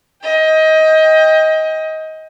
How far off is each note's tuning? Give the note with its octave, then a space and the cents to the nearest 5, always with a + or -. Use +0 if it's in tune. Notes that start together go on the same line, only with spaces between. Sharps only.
D#5 +20 G5 +25